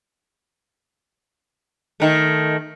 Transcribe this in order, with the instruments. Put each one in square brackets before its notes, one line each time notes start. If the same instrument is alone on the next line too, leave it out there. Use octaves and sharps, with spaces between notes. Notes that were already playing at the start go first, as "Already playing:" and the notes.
[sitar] D#3 A3